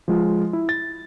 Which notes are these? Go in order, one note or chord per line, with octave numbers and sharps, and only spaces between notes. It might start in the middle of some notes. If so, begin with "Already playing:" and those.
F3 G#3 F4
E4
A6